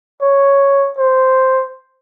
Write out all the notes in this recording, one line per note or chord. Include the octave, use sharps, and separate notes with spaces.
C#5
C5